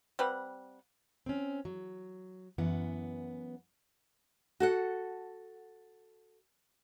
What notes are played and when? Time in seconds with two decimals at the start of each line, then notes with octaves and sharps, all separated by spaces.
0.19 G3 C4 B4 F#5
1.26 C4 C#4
1.65 F#3
2.58 F#2 E3 B3 F#5
4.60 F#4 A4 F#5